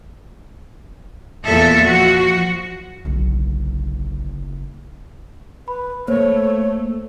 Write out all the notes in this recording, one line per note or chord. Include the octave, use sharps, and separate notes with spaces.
E2 A#2 E3 A4 E5
F3 F#4
F#1 B1 D3
B4 B5
A3 A#3 C5 C#5